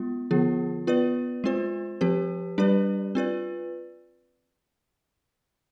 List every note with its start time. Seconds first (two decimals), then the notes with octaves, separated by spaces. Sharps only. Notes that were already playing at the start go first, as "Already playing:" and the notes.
Already playing: G#3 B3 F4
0.31 D3 F3 B3 F4 G#4
0.87 B3 F4 B4 D5
1.44 G#3 C4 F4 C5
2.01 F3 C4 G4 B4
2.58 G3 D4 G4 B4 D5
3.15 C4 F4 B4 D5